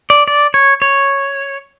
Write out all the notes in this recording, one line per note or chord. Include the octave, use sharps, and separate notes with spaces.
D5
D5
C#5
C#5